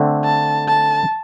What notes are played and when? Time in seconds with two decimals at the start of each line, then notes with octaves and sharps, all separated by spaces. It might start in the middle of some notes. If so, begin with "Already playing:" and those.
Already playing: D3 A3 C4
0.25 A5
0.68 A5